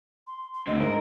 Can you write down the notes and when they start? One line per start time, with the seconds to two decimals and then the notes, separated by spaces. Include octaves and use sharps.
0.27 C6
0.54 C6
0.67 D2 A2 C4 D#5
0.80 G#2 A#4